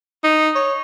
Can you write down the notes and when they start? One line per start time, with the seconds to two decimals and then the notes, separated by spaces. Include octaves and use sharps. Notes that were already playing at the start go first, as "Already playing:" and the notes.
0.24 D#4
0.55 C#5